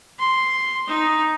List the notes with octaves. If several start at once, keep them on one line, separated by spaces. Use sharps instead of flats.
C6
D#4